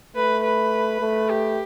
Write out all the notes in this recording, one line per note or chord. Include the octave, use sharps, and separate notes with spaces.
A3 B4
B4
A3
G4